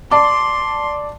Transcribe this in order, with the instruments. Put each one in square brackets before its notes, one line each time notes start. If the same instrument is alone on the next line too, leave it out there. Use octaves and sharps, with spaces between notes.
[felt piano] D5 A5 [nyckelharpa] C6 [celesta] D6